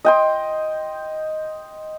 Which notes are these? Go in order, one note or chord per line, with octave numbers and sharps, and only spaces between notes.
D#5 G5 C6